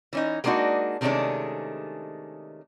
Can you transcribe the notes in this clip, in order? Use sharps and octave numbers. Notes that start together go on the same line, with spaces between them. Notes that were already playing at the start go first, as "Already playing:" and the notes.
E3 C#4 D#4
G#3 A#3 B3 D4 D#4 F#4
C3 D#3 G#3 A3 C#4 D4